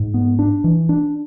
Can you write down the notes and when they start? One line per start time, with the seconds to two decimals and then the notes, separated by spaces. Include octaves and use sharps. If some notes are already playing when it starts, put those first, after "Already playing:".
Already playing: G#2
0.14 B3
0.39 D4
0.64 E3
0.89 D4